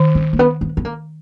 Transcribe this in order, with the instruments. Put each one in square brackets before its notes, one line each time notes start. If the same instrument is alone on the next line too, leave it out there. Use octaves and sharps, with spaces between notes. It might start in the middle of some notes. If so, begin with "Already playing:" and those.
Already playing: [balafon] D#3
[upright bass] C4
A#3
B3
B3
B3
A#3